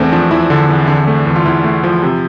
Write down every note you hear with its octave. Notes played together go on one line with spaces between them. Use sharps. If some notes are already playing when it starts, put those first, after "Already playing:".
Already playing: E2 A3 C4 D4
F3 D4
E2 E4
D3
E2
D3
A3
E2
F4
E2 E4
A3
F3
C3